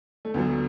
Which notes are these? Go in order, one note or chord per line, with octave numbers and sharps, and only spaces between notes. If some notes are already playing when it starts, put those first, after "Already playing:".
A3
D2 D3 F#3 B3